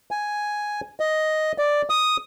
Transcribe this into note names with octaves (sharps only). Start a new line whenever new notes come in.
G#5
D#5
D5
D#6